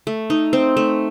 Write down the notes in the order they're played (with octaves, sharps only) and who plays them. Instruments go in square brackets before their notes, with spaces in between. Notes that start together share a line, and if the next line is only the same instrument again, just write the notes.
[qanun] A3
D#4
C4
A3